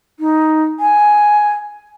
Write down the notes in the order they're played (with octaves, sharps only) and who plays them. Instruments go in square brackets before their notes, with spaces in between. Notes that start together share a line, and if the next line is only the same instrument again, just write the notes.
[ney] D#4
G#5